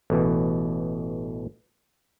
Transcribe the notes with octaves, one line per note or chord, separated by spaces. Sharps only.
A1 B2 E3